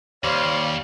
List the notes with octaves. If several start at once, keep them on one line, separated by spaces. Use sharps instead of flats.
D#2 G3 C5 C#5 F5